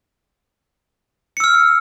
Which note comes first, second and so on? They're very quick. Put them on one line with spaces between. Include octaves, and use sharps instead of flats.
C#7 E6 F6